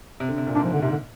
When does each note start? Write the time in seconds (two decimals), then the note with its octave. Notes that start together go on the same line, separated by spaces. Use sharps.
0.20 C3
0.29 D3
0.38 C3
0.47 A#2
0.55 G#2 D4
0.64 F3
0.73 D3
0.82 G#2 C3
0.91 D3